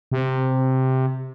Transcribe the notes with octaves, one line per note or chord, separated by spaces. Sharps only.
C3